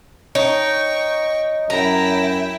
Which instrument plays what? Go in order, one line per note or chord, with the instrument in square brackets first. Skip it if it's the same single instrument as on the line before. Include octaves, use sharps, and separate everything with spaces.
[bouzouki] D#4 [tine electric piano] C#5 [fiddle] G5 C#6
[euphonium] F#2 [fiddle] E4 G5 [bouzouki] A#5